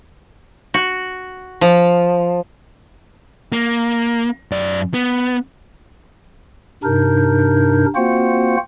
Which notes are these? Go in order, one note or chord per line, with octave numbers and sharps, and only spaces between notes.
F#4
F3
A#3
F#2 D5
B3
G2 C3 D4 D#4 A#4 G6
A#3 C4 F4 F#4 C5 F#5